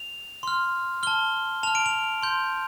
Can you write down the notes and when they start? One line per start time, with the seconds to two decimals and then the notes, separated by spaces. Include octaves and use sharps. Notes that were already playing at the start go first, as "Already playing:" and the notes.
Already playing: F7
0.43 C6 F6
1.03 A5 F6 G7
1.63 A5 F6 F7
1.75 D7
1.86 F7
2.23 C6 G6